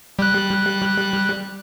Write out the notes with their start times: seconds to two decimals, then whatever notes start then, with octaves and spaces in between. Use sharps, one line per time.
0.19 G3 F#6